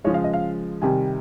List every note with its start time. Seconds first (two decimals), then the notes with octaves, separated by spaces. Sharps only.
0.04 C#3 F3 G#3 C#5
0.14 F5
0.24 D#5
0.33 F5
0.82 C3 D#3 G3 G#5